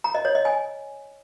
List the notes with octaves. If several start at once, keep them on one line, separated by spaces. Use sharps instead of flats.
A#5
D#5
C#5
D#5
G#5